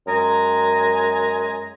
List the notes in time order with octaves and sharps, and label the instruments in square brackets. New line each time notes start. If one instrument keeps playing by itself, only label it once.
[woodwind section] F#2 G#3 G#5 A#5